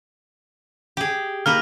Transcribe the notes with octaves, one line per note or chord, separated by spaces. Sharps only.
G4 G#4
A#3 D#4 B4 F6